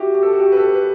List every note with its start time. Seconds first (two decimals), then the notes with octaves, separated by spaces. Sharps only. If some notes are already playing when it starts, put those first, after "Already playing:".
Already playing: E4 F#4 G4
0.15 G4
0.23 A4
0.32 F#4
0.40 G4
0.52 B4
0.57 A4
0.74 B4